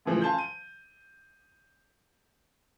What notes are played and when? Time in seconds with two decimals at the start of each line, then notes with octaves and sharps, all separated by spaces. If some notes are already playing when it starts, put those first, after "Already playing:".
0.05 A2 C#3 E3 F3
0.22 F5 G#5 A5 C6 G6
0.38 D#7